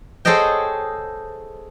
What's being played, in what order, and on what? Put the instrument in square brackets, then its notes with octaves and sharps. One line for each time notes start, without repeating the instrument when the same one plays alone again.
[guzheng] G#4 A4 C5 C#5 D#5 G5